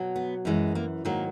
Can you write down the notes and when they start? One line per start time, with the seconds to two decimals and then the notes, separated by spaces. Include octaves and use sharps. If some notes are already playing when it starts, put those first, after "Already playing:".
Already playing: B2 F#3
0.16 B3
0.45 F#2 E3 G#3
0.75 A#3
1.05 G#2 D#3 F#3 A#3